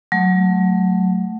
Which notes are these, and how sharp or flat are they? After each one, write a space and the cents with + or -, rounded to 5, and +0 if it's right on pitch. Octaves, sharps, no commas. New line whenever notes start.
F#3 +0 A3 +0